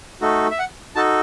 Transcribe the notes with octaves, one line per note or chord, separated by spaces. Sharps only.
A3 D#4 F#4 A4
E5
F#5
D#4 F#4 A4 A5